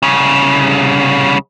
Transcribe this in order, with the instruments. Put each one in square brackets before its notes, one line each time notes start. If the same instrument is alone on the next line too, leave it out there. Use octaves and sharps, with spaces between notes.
[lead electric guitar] C2 C#3